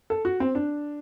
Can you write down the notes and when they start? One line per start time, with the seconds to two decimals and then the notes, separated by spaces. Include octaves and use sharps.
0.10 A4
0.25 F#4
0.40 C4
0.55 D4